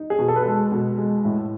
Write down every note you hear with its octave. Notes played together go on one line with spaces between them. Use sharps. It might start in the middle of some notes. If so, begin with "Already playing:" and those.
Already playing: D#4
G#4
B2
A4
B4
G#3 A4
B2
G#3
A2